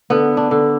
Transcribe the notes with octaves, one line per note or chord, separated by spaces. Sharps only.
D3 B3
D4
D3